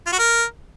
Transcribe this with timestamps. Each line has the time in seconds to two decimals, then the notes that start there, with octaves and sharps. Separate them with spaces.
0.07 F4
0.13 F#4
0.19 A#4